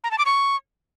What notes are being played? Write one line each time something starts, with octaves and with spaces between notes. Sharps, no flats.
A#5
A5
D6
C#6